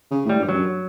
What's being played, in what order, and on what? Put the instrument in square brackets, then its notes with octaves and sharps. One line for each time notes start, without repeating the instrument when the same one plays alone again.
[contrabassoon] C#3
[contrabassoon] A2 [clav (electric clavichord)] G3
[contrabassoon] G2
[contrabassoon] F#2 [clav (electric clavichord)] F#3